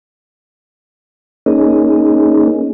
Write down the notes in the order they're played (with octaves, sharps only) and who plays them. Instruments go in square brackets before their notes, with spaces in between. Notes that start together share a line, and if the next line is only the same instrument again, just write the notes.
[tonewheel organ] A#3 C#4 D#4 G#4